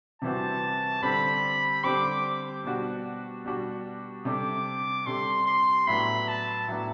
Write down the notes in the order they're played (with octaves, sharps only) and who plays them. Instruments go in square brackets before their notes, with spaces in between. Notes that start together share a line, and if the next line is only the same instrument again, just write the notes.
[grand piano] C3 E3 G3 C4 F#4 [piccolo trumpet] A5
[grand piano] D3 G3 C4 G4 [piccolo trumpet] B5
[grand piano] D3 G3 C4 G4 [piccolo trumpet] D6
[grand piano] B2 G3 D4 F#4
B2 G3 D4 F#4
[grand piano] C3 G3 D4 A4 [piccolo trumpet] D6
[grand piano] C3 G3 D4 A4 [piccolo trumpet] C6
[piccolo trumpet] C6
[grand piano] A2 F#3 B3 D4 [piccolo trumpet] B5
[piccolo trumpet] A5
[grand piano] A2 F#3 B3 D4